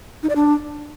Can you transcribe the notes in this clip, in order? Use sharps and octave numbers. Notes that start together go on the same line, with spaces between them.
D#4
D5
D4